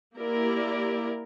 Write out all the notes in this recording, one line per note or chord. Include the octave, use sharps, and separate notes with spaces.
A#3 E4 G4 A#4 D5